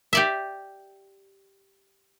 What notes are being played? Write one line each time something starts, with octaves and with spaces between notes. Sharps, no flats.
G4 D5 E5